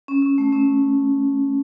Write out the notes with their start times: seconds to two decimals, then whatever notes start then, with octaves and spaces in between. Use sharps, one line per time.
0.08 C#4
0.22 C#4
0.38 A3
0.52 C#4